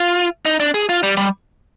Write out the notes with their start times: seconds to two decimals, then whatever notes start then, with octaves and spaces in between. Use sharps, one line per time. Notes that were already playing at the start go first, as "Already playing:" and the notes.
Already playing: F4
0.45 D#4
0.60 D4
0.74 G#4
0.89 F4
1.03 G3
1.17 G3